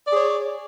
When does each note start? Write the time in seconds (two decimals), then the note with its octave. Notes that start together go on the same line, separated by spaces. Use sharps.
0.06 D5
0.11 G#4
0.15 C#5